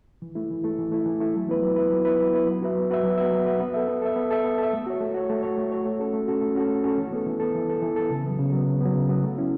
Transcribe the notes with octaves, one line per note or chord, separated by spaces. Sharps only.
E3
A3 E4
E3
A3 E4
E3
A3 E4
E3
A3 E4
F#3
B3 E4 B4
F#3
B3 E4 B4
F#3
B3 E4 B4
F#3
B3 E4 B4
F#3
B3 F#4 B4 E5
F#3
B3 F#4 B4 E5
F#3
B3 F#4 B4 E5
F#3
B3 F#4 B4 E5
B3
A4 E5
B3
A4 E5
B3
A4 E5
B3
A4 E5
A3
F#4 C#5
A3
F#4 C#5
A3
F#4 C#5
A3
F#4 C#5
A3
C#4 F#4 A4
A3
C#4 F#4 A4
A3
C#4 F#4 A4
A3
C#4 F#4 A4
E3
B3 A4
E3
B3 A4
E3
B3 A4
E3
B3 A4
C#3
F#3 B3
C#3
F#3 B3
C#3
F#3 B3
C#3
F#3 B3
A3
C#4 E4